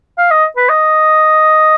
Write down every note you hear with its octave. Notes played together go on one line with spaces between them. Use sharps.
F5
D#5
B4
D#5